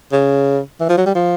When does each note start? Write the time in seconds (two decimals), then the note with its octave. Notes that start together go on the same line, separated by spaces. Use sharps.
0.12 C#3
0.80 E3
0.89 F3
0.98 F#3
1.06 G3
1.15 F3